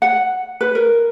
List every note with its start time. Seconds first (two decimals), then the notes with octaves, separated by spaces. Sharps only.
0.02 F#5
0.61 B4
0.75 A#4